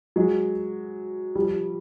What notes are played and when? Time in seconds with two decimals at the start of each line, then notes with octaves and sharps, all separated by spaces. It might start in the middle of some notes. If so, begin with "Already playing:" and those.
0.16 F#3 G#3
1.35 F3 G3